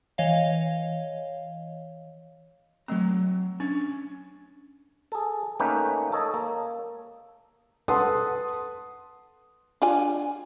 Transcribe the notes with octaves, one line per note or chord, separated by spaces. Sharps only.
E3 C#5 D#5 F5
F#3 A3 C4 A#5
C#4 D4
G#4 A4
A3 A#3 C#4 D#4 B4 G5
A4 C#5 D#5
A#3
A4 B4 F#5 A5 C6 D#6
D4 F4 G#5